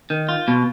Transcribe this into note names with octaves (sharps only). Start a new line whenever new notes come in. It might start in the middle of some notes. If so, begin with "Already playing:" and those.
D#3
F4
B2